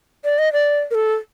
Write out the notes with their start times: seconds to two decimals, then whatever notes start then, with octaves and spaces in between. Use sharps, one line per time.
0.25 D5
0.38 D#5
0.53 D5
0.91 A#4
0.95 A4